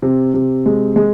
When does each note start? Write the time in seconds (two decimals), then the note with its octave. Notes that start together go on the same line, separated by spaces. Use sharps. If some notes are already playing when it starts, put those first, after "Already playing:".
0.02 C3
0.34 C3
0.66 G#3
0.96 G#3